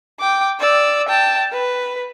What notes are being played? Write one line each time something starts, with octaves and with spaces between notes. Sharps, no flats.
G5 D6
D5 E6
G5 A5
B4